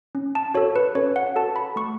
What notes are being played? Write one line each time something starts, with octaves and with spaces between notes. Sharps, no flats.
C#4
A5
F#4 A4 C#5
B4
C#4 C#5
F#5
F#4 A4 A5
B5
A3 C#6